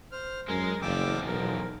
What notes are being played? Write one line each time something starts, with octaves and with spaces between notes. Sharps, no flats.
C5 F6
F#2 G#3 A#4
F#1 E2 F3 G5 D6 E6
B1 A#4